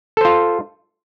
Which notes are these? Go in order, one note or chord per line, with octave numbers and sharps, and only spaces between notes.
F4 A4 C5